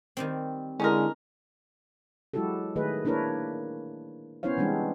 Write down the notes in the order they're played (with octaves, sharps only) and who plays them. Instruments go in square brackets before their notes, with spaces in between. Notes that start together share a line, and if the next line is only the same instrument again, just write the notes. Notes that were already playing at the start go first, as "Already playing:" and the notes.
[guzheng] D#3 G3 C4
[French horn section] D3 G#3 [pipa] C#4 D#4 A#4 [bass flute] E4
[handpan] F#3 G#3 E4 F#4 G4 A4
D#3 A3 G#4 B4 D#5
A#3 D4 E4 A#4 B4 C#5
B3 C#4 E4 C5 C#5 F5
E3 G3 G#3 C4 D4